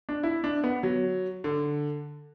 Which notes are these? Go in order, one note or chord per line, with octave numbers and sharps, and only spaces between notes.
D4
E4
D4
B3
F#3
D3